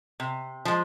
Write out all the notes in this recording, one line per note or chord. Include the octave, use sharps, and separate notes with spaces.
C3
F3 G#3